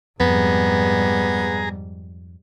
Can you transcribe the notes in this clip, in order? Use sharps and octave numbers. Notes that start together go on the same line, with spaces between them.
F2 G#2 G3 B3 G#4 A#5